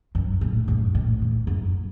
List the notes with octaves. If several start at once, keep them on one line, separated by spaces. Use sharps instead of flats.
F#2
A2
F#2
A2
E2
F#2